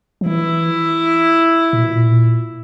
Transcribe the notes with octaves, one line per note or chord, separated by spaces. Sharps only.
F3
E3 E4
A#2
B2
A#2